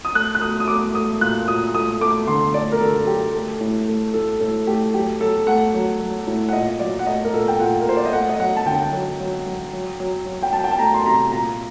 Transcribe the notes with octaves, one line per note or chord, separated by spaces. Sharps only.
D#6
A3 F#6
F#6
A3 D#6
D#6
A3 D6
A3 D#6
A#2 F#6
A#2 D#6
A3 D#6
A3 D6
D3 C6
A3 D5
A#4
D3 A4
F#3 G4
A3
A2
A3
A2 A4
A2 A4
A3 G4
F#3 G4
F#3 A4
A3 F#5
F#3
F#3
A2
F#5
A#2 D#5
F#3 D5
F#5
A3 D#5
A#4
A#2 A4
G5
A#2 F#5
A#4
A#2 C5
D5
D#5
A3 F#5
D#5
F#3 F#5
A5
D3 G5
F#3
F#3
F#3
F#3
F#3
F#3
G5
F#3 A5
G5
A5
A3 A#5
C6
C3 A#5
A#2 A#5